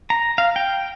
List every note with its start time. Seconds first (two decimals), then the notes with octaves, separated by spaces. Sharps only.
0.10 A#5
0.38 F5
0.56 G5